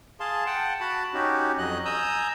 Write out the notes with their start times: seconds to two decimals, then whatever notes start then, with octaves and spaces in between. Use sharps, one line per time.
0.20 G#4 F5 A5 C6
0.46 F#5 G5 A5
0.80 F#4 A5 B5
1.14 C#4 D#4 F#4 G4
1.58 F2 F#3 D#5 F#6
1.85 G#5 A#5 D#6 E6 G6